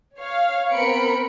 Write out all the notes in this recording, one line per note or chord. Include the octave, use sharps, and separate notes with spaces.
C#5 F5
B3 C4 A#4 B5 C#7 D7